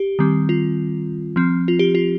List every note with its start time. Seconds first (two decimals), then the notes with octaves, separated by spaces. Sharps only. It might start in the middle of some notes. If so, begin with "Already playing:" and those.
Already playing: G4
0.19 D#3 G3 C4
0.49 F4
1.36 F3 C4
1.68 F4
1.79 G4
1.95 F4